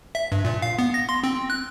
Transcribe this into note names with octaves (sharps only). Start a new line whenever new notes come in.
E5
G2
A#2
F5
B3
A#6
C6
C4
F#6